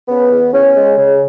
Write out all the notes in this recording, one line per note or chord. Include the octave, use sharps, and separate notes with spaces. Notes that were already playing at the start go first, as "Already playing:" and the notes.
C#3 B3
E2
E2 C#4
G#3
C#3